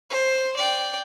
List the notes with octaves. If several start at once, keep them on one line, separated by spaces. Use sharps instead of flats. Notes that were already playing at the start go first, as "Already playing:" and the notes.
C5
D5 G5